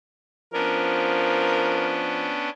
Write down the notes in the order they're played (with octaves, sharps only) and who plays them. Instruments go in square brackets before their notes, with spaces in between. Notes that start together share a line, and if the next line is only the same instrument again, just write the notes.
[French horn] F3 [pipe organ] B3 C#4 D4 [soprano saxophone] A#4